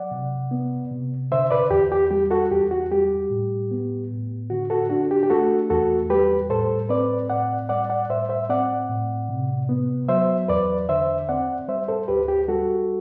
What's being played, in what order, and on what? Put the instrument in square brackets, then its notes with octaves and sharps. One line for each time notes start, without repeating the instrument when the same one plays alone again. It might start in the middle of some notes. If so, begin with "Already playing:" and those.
Already playing: [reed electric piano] F#3 D5 F#5
C3
B3
C3
D3 C5 E5
B4 D5
E2 G4
G4
G3 G4
F#4 A4
E2 G4
F#4
G3 G4
A2
B3
A2
D3 F#4
F#4 A4
D4 F#4
G4
G4
A3 F#4 A4
E2 F#4 A4
G3 G4 B4
A2 A4 C5
C4 B4 D5
A2 D5 F#5
G3 D5 F#5
D5 F#5
A2 C5 E5
C5 E5
C4 D5 F#5
A2
C3
B3
F#3 C5 E5
E2 B4 D5
D3 C5 E5
C4 D5 F#5
G3 C5 E5
A4 C5
D2 G4 B4
G4
G3 F#4 A4